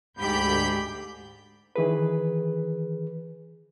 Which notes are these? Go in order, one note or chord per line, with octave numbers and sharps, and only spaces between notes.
D2 G#2 G4 B5 G6
D#3 E3 G#4 B4